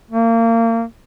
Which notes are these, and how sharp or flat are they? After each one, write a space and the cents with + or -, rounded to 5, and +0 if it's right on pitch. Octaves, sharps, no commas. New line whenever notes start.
A#3 -30